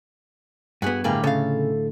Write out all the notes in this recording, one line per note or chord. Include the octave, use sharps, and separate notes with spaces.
G2 B3 F#4 G#4
A2 D3 G3 A#3 G#4
C#3 A4 F5